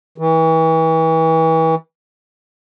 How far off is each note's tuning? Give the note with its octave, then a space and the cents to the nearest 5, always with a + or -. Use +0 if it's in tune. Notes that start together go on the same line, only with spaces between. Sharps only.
E3 -35